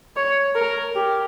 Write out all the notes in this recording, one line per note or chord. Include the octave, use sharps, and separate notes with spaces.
C#5
A#4
G4